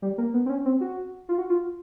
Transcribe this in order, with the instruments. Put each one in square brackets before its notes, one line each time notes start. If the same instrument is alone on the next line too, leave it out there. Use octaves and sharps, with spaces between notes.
[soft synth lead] G3
A#3
B3
C4
C#4
C4
F#4
F4
F#4
F4